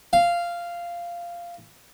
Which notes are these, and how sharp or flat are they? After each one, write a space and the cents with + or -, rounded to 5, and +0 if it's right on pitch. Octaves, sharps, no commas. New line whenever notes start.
F5 -10